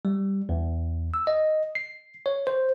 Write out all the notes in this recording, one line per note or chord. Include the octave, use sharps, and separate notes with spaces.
G3
E2
E6
D#5
C7
C#5
C5